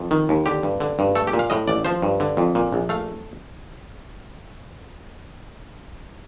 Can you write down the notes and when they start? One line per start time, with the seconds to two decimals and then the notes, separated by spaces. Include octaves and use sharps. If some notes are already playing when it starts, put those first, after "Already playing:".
Already playing: F2
0.11 D#3
0.29 D#2
0.46 D3 G4
0.63 G2
0.80 D3
0.99 G2
1.15 A3 A4
1.27 G4
1.33 A#2
1.39 F5
1.50 A2 D#5
1.68 A1 D5
1.85 F3 C5
2.02 G2
2.20 D3
2.37 F2
2.55 A#2
2.72 A#1
2.89 A3 F5